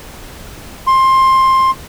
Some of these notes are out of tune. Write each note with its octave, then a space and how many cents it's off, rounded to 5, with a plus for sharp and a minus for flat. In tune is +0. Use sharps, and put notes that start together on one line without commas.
C6 +15